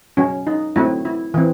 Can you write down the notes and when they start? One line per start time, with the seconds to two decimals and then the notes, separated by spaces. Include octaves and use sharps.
0.17 F#3 C#4
0.47 D#4
0.76 F#3 A3 C4 E4
1.05 E4
1.34 E3 C4